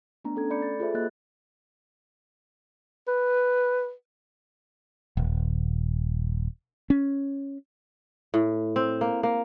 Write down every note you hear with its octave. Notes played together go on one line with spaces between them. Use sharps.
A3 B3 D4 A#5
C#4 A4 G#6
A3 A4 D5 B5 G6 C#7
A6
F4 G#4 A4 C5 E5
A#3 F#4 D#5 B5 F#6 A6
B4
D#1
C#4
A2
C4
A#3
A#3